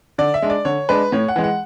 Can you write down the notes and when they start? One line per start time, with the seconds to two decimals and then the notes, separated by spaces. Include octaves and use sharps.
0.18 D3 D5
0.34 E5
0.42 G#3 D4
0.50 D5
0.65 D3 C#5
0.89 G#3 D4 B4
1.12 A2 C#5
1.28 F#5
1.36 E3 G#3
1.44 F#5